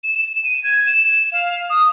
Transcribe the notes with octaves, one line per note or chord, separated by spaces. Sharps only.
E7
D#7
G#6
E7
F5
D#6